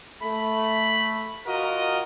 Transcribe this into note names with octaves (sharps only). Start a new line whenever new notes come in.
A3 B5
F4 F#4 A#4 D#5